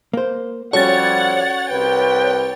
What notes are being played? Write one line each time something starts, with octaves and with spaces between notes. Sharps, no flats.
A#3 C5
F3 G3 C#4 F#4 A4 C#5 F#5 A6
C2 B4 G5